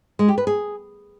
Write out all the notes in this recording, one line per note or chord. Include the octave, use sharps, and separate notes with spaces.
G#3
G4
B4
G#4